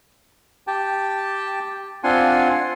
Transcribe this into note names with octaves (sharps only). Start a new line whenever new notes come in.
G4 G5 A5
C4 D4 F4 F#5 G#5 C6